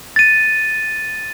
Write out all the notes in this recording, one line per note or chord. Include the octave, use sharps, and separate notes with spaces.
A6 D#7